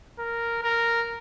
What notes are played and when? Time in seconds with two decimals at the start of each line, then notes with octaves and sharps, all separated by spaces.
0.19 A#4
0.64 A#4